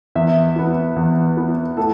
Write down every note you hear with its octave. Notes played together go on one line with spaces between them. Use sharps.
E2 E5
E3 B3
E2
E3 B3
A2 A4